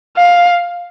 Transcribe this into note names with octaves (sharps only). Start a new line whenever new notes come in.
F5